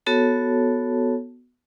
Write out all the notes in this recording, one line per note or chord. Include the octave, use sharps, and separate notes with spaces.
B3 F#4 A4 C#5 A5